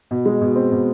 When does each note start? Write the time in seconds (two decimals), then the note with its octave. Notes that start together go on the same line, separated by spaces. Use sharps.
0.11 B2
0.26 G#3
0.41 B2
0.55 C4
0.72 B2